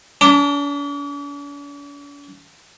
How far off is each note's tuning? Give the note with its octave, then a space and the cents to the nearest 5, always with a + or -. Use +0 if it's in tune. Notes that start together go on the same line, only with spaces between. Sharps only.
D4 -45 A5 +30 D6 -15